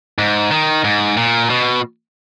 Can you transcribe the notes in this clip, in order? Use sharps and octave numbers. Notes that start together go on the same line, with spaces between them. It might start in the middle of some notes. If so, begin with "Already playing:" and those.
G#2
D#3
G#2
A#2
B2